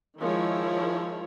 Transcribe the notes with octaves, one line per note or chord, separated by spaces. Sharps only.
D#3 F3 G#3 E4 C#5